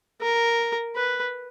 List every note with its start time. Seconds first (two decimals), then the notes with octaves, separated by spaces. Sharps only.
0.22 A#4
0.96 B4